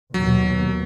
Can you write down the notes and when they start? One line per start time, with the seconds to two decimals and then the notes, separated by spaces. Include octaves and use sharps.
0.14 D#2 B2 F#3